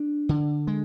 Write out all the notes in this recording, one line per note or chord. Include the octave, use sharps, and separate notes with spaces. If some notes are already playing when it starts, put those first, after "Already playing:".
Already playing: D4
D3
G#3